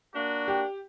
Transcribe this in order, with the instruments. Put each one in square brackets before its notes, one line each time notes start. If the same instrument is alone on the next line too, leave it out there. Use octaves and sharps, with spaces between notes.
[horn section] A#3 D4 F#4
[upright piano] G4